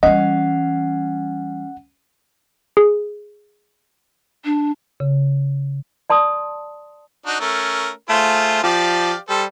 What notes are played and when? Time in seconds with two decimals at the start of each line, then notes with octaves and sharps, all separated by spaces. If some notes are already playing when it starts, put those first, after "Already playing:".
0.03 E3 G3 C#4 D#5 F5 F#5
2.77 G#4
4.45 D4
5.00 C#3
6.10 D5 A5 C6 D#6
7.27 D4 D#4 F#4
7.41 A3 C#4 A#4
8.10 A3 F4 G#4 C5
8.64 F3 G4 D5 F5
9.29 G3 A4 C5